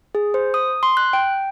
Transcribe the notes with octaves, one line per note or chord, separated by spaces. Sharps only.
G#4
C5
D#6
C6
F#6
G5